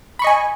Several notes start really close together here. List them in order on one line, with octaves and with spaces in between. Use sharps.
B5 C#6 D#5 G#5